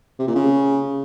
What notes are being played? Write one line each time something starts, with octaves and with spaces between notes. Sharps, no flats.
C3
A#2
C#3